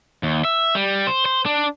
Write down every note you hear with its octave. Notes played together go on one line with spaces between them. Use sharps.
D#2
E5
G3
C5
C5
D4